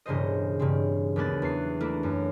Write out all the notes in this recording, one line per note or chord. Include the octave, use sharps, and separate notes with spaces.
E1 G2 C#3 C5 D#5
G2 C#3 C4
D#2 F#3 B3 D4 F#6 A6
E2 C7
A3 A#3 D4 E4
F#2